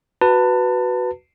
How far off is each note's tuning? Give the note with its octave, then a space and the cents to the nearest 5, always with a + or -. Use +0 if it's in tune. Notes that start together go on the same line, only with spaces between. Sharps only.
F#4 +0 B4 +0 A5 +30